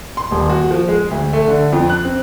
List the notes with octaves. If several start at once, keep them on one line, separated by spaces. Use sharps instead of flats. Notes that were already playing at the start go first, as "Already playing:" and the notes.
C6
D#1
F#4
F3
G#3
D2
A3
D3
F2
F#6
C4